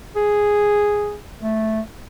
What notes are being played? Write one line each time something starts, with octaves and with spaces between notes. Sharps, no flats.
G#4
A3